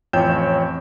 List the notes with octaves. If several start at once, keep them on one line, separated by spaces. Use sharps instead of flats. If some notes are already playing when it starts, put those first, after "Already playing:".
A1 F2 C#5 G5 G6 E7